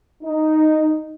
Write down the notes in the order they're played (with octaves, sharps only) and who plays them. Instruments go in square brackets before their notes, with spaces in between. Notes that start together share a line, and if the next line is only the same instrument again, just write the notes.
[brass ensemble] D#4